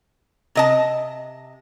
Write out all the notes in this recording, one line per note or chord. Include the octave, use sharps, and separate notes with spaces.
C3 D#5 A5